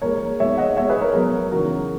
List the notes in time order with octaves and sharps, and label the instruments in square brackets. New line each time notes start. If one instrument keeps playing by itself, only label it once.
[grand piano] A#2 G#3 A#4 C#5
B2 G#3 C#5 E5
D#5 F#5
B2 G#3 C#5 E5
G#4 B4
A#4 C#5
B2 F#3 A#4 C#5
C#3 E3 G#3 F#4 A#4